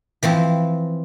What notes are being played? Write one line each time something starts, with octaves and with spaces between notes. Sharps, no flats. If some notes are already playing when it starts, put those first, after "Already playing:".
E3 F3 C4 A5